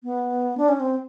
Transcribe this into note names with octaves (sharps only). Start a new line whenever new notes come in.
B3
D4
C#4
C4